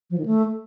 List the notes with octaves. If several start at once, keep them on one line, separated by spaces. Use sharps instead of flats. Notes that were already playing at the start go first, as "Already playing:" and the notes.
F3
D#3
A3